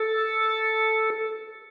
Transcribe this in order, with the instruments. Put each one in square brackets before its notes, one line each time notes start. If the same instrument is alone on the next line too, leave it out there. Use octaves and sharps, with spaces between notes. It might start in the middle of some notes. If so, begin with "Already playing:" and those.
Already playing: [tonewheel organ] A4